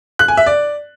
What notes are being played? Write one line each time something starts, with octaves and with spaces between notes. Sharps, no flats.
F#6
G#5
E5
D5